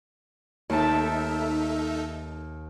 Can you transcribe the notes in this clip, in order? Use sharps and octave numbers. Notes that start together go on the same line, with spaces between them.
D#2 D#4 A4 E5 A5